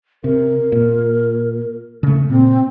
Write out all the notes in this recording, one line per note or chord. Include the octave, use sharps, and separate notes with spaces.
C3 A#4
A#2
C#3 A3
A#2 C4